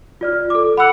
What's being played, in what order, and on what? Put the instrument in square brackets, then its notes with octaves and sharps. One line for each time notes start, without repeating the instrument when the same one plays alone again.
[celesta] F4 D5 F6
A4 D6
[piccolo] F#5 [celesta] B5 E6